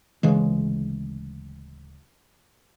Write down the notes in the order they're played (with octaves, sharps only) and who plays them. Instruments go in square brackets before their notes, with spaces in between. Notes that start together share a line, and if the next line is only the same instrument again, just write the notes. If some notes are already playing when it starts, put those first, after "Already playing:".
[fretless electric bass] D1 C#3 E3 G#3